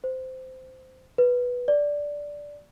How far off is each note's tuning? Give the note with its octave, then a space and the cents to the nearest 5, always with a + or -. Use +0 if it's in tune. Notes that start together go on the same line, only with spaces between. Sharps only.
C5 -15
B4 -5
D5 -5